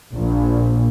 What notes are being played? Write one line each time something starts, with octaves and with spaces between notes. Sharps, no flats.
A#1